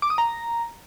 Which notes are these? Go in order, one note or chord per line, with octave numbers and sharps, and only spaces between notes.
D6
D#6
A#5